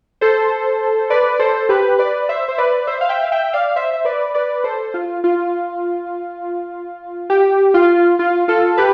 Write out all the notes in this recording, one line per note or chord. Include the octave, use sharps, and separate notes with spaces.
A4 C5
B4 D5
A4 C5
G4 B4
B4 D5
C5 E5
C5
B4 D5
C5 E5
F5
E5 G5
F5
E5 G5
D5 F5
C5 E5
E5
B4 D5
B4 D5
A4 C5
F4
F4
G4
F4
F4
F4 A4
G4 B4